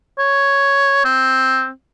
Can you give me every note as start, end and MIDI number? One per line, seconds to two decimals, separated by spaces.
0.19 1.04 73
1.05 1.69 60